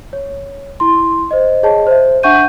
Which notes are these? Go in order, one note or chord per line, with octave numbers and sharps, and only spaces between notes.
C#5
E4 C6
C5 D#5
G#4 C#5 D#5 A5
C5 E5
D4 E5 F#5 C#6 G6 D#7